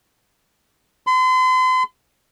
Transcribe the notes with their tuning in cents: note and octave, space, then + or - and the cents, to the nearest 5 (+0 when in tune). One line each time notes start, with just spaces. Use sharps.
C6 -40